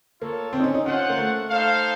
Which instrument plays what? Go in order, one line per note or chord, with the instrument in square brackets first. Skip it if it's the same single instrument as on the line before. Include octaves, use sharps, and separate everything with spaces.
[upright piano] A#3 [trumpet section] F4 A4 C#5
[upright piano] C4
D#4
C#4
D#4
[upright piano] C#4 [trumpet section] F4 C5 F#5
[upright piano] A#3
A3
[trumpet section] D#4 A4 C5 F5